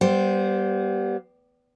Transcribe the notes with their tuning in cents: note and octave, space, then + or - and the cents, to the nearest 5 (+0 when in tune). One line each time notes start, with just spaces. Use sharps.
G3 -15 B3 -30 C5 +0